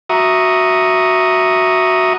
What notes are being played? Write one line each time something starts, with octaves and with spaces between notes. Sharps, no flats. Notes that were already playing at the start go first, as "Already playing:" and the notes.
F#4 E5 A#5 C#6 D#6